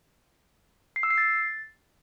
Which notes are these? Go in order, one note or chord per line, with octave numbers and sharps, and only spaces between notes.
C7
E6
C7
A6